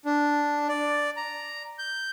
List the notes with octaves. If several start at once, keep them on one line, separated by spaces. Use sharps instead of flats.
D4
D5
A#5
G6